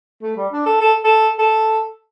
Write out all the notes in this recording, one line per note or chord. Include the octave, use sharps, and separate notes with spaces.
A3
G3
D4
A4
A4
A4
A4